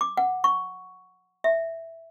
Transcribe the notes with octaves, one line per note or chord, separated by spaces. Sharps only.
D6
F#5
C#6
E5